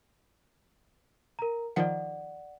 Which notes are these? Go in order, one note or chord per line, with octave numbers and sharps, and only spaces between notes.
A#4 A#5
D#3 F3 D5 F#5 C#7